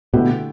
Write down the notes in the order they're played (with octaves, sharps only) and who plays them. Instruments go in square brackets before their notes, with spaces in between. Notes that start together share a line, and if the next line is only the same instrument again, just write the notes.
[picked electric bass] B2 [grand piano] D3 A3 E4 G4